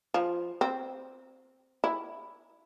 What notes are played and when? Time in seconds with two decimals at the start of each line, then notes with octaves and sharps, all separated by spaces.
0.14 F3
0.61 C4
1.84 E4